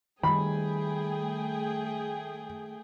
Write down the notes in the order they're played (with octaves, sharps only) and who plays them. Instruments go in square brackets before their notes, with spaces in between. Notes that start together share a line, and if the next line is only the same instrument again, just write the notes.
[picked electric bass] D#3 G3 [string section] A3 G#4 G5 [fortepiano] B5